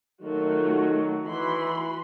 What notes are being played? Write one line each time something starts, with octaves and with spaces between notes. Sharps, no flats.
D#3 F#3 A3 F4 F#4
E3 F#4 B5 C6